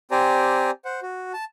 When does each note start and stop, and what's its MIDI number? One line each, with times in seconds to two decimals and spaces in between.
0.11 0.71 60
0.11 0.71 67
0.11 0.71 72
0.11 0.71 74
0.11 0.71 80
0.11 0.71 82
0.85 1.00 72
0.85 1.00 78
1.02 1.33 66
1.34 1.45 81